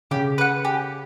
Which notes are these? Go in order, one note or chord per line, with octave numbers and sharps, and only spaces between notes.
C#3 G4
B4 F#5
G4